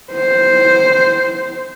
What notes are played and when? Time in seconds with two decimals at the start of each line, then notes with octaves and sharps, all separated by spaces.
0.12 C5